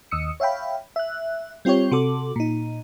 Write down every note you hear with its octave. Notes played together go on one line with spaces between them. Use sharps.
D#2 D#6 E6 C#7
C#5 E5 F5 G5 B5
E5 F#6
G3 C4 F4 G4 C#5
C3 F#4 A4 D6
A#2 D#4